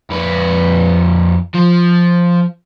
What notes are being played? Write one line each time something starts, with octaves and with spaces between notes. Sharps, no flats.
F2 B4
F3